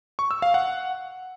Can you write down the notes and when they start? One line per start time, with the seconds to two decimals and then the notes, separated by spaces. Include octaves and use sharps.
0.19 C#6
0.31 E6
0.42 F5
0.54 F#5